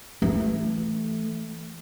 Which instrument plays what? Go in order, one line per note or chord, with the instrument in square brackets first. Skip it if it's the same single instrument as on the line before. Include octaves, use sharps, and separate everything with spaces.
[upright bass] E3 A3